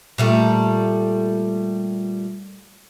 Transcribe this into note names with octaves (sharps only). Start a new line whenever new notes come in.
A#2 G3 A3